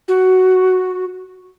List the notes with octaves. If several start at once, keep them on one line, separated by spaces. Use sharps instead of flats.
F#4